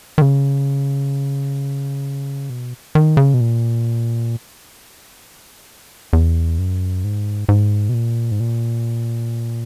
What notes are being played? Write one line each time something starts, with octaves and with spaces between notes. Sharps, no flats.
D#3
C#3
B2
D#3
C#3
B2
A#2
E2
F#2
G#2
G#2
B2
A#2
G#2
A#2